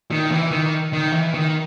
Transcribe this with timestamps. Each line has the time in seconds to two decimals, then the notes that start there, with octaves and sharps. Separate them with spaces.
0.11 D#3
0.31 E3
0.51 D#3
0.93 D#3
1.14 E3
1.34 D#3